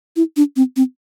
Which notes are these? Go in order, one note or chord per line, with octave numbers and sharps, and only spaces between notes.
E4
D4
C4
C4